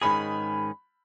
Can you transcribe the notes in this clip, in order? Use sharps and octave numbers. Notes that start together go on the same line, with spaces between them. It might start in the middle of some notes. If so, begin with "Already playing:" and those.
G#2 D#3 G#3 C#4 G#4 B5